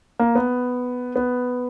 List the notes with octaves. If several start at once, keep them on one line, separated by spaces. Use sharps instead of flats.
A#3
B3
B3